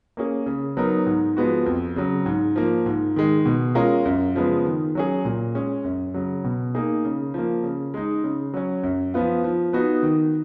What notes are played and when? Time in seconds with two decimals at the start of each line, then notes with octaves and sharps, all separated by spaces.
0.17 A#3 C#4 G#4
0.46 C#3
0.77 F#3 B3 D#4 A#4
1.07 G#2
1.37 F3 G#3 B3 F#4
1.66 F2
1.96 C#3 F#3
2.26 G#2
2.56 F3 A#3
2.86 G#2
3.16 D#3 G#3
3.46 B2
3.75 G#3 C#4 F4 A#4
4.05 F#2
4.35 C#3 F3 G#3 B3
4.65 D#3
4.95 F#3 C#4 G#4
5.25 A#2
5.55 G#3 C#4
5.84 F#2
6.14 C#3 F#3
6.44 B2
6.75 A#3 D#4 G#4
7.05 C#3
7.34 F3 A#3
7.64 C#3
7.94 G#3 D#4
8.24 C#3
8.54 F#3 C#4
8.83 F#2
9.14 F3 B3 F4
9.44 F3
9.73 B3 D#4 F#4
10.03 D#3